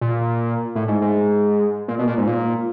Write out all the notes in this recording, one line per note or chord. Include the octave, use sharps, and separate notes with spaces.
A#2
A2
G#2
G#2
A#2
B2
A#2
G#2
A#2